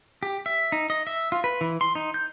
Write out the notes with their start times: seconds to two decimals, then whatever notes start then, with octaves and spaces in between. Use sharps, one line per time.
0.23 G4
0.46 E5
0.72 D#4
0.90 D#5
1.07 E5
1.32 F4
1.44 B4
1.61 E3
1.81 C6
1.95 D#4
2.14 G6